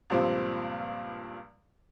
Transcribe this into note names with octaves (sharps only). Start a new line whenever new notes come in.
C#2 G2 A#2 F3 G3 C4